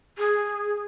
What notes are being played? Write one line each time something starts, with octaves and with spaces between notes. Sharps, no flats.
G#4